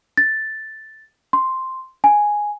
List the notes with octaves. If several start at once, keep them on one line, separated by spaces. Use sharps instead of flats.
A6
C6
G#5